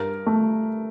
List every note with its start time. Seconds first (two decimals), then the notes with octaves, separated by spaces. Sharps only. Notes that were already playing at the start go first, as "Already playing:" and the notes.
Already playing: G2 A#4
0.26 A3